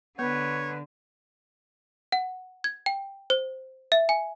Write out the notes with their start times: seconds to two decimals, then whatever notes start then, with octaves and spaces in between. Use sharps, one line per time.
0.19 D3 B3 B4 C#5
2.12 F#5
2.64 G#6
2.86 G5
3.30 C5
3.92 E5
4.09 G#5